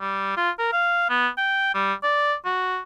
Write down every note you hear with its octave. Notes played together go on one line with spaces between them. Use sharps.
G3
F4
A#4
F5
B3
G5
G3
D5
F#4